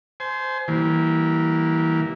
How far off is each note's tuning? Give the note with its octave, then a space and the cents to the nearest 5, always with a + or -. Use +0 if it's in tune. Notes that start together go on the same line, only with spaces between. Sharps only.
C5 -10 G#5 +35
E3 -20 G3 -30 A#3 +0